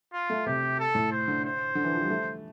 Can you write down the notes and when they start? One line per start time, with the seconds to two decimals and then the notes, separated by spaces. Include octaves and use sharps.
0.13 F4
0.30 A3
0.46 C3 G4
0.79 A4
0.95 A2
1.12 C5
1.28 D3
1.45 C5
1.75 D3
1.84 E3
1.93 F3
2.01 G3
2.10 A3